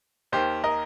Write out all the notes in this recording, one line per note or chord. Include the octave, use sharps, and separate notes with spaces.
D#2 D#3 G4 C5
A#4 D#5